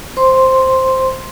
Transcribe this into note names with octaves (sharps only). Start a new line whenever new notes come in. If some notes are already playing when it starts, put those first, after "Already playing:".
C5 C6